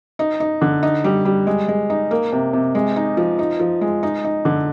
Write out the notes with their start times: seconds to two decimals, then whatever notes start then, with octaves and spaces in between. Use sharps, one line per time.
0.19 D#4
0.40 D#4
0.61 D3
0.83 D#4
1.04 G3
1.25 G3
1.47 G#3
1.68 G#3
1.90 D#4
2.11 A#3
2.32 C3
2.53 C3
2.75 G#3
2.96 D#4
3.17 F3
3.39 D#4
3.59 F3
3.81 G#3
4.03 D#4
4.24 D#4
4.45 D3